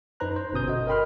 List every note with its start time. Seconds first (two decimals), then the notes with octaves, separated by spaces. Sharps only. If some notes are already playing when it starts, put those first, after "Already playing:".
0.20 F#2 D#4 B4 C5 A#5 F#6
0.36 C5
0.53 G1 B2 C#4 D#6 G6
0.68 F#4 A4 D#5
0.87 A#4 D#5 G5 B5 C6 F6